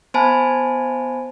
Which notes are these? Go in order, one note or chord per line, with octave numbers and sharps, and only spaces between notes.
B3 C5 G#5 A5 B5